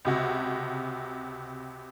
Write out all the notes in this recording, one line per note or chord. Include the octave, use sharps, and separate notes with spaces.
C#2 C3 F#4